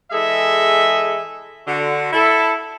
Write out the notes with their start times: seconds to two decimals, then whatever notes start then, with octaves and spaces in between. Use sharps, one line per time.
0.12 E3 G#3 G#4 A4 D#5 E5
1.66 D3 F#4
2.12 E4 A4